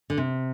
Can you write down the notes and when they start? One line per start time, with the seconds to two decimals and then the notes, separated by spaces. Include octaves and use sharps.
0.10 D3
0.18 C3